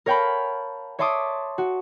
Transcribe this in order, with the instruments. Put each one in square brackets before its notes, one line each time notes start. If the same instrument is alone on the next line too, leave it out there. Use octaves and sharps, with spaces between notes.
[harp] A#4 C#5 F5 G5 A5 B5
C#5 E5 A5 C6 D6 D#6
F#4